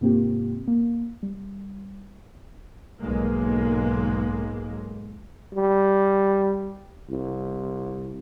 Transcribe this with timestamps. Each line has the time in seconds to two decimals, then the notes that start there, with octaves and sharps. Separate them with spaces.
0.01 G#2 C3 A#3 C4 F4 G4
0.68 A#3
1.23 G3
3.00 B1 G#2 G#3 A#3
5.55 G3
7.10 C2